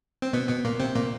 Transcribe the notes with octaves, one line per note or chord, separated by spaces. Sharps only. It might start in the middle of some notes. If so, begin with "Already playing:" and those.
C4
B2 B3
B2 B3
A#2 A#3
C3 C4
A#2 A#3